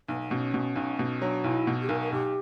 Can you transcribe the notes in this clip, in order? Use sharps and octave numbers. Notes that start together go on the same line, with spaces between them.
B1 B3
B3
B2 C#4
B2
B1
B2
F#3 D4
B1 E4
B2
G4
B1 A#4
A#4
B1 G4